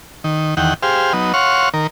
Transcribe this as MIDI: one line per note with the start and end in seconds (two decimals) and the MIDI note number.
0.24 0.55 51
0.57 0.74 40
0.57 0.74 51
0.57 0.74 78
0.57 0.74 79
0.83 1.13 67
0.83 1.13 68
0.83 1.13 72
0.83 1.13 77
1.13 1.33 54
1.13 1.33 59
1.13 1.33 63
1.34 1.69 73
1.34 1.69 77
1.34 1.69 78
1.34 1.69 84
1.34 1.69 85
1.74 1.87 51
1.74 1.87 70